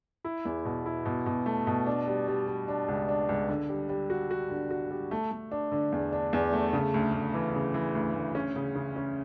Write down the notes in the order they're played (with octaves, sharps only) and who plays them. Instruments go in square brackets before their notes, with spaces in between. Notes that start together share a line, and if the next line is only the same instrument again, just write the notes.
[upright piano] E4
E2
B2
E4
B2
B2
A3
B2
D4
G3
G3
G3
D4
C#2
D4
C#2
D3
G3
G3
F#4
F#4
D3
F#4
G3
A3
A3
D4
D3
E2
D4
E2
A3
C#3
D2
D2
E3
C#3
E3
D2
D2
C#4
C#3
C#3
C#4